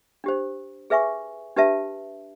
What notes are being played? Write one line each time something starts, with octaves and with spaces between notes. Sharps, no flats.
D4 G4 C5
G#4 B4 E5 G#5 C#6
D4 G4 B4 E5 A5